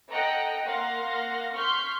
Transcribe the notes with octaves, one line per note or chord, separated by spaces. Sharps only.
A4 D#5 F#5 G5 A#5
A#3 F5 F#5 C6 A#6
C6 C#6 F6 G6 B6 C7